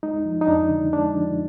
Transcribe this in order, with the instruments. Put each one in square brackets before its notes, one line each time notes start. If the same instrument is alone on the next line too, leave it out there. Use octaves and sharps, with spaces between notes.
[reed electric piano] G#3 D#4
F3
D#4
F2 D4
D3
G#3 D4
F3